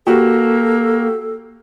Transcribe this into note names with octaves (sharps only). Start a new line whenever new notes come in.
A#3 F#4 G4 A4